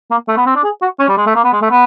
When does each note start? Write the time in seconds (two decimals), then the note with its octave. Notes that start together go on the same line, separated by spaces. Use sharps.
0.11 A#3
0.28 A3
0.37 B3
0.46 C4
0.55 D4
0.64 G#4
0.82 F#4
0.99 C#4
1.09 G3
1.17 G#3
1.26 A3
1.36 A#3
1.44 B3
1.53 G#3
1.62 A3
1.71 B3